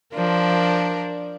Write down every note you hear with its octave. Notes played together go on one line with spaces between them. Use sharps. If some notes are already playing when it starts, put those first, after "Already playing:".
F3 D4 A#4